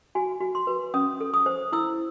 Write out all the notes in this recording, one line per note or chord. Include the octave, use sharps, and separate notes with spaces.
F#4 G#5
F#4
C6
B4
C#4 D#6
A4
D#6
C5
E4 E6